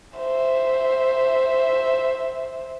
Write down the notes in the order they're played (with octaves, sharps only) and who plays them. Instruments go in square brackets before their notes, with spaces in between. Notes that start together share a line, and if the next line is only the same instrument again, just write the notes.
[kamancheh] C5 E5